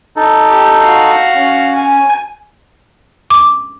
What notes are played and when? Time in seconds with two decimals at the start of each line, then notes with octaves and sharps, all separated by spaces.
0.16 D#4 A4
0.47 G4
0.78 F#4 F5
1.35 C#4
1.75 G#5
3.30 D6